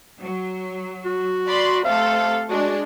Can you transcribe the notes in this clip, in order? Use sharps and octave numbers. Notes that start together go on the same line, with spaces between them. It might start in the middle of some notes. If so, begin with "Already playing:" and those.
F#3
F#4
D5 B5 C6
C3 A3 A4 F5
G#3 D4 F#4